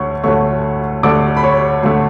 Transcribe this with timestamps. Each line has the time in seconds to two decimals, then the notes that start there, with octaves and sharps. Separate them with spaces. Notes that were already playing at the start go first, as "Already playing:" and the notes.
Already playing: D2 D3 A3 C#5 C#6
0.24 D2 D3 A3 C#5 C#6
1.03 D2 D3 A3 D5 D6
1.37 B5
1.43 C#5 C#6
1.83 D2 D3 A3